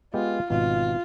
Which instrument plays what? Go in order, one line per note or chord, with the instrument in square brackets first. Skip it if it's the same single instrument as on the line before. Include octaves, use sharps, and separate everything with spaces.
[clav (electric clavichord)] G#3 B3 G4 [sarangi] F4
[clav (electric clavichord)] G#1 B2 [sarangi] F4